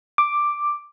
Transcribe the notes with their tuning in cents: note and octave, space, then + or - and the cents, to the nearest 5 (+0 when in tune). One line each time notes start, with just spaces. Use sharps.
D6 +5